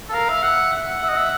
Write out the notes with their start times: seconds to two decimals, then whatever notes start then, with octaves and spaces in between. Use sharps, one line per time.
0.09 A4
0.13 A#4 F5
0.29 E5
0.43 E5 F#5
0.73 F#5
1.03 E5
1.09 D#5
1.17 E5